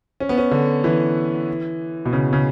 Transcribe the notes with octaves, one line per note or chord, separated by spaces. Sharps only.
C#4
B3
C#4
D3
E3
B2
C#3
C#3